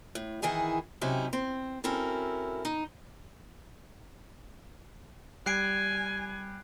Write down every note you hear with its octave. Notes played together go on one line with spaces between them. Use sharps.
A2
D#3 E3 E4 G#4 F#5
C3 F#3 C#4 D#4 E4 G4
C4
C4 C#4 E4 F#4 A4 A#4
D#4
G3 G#5 F#6 C7 D7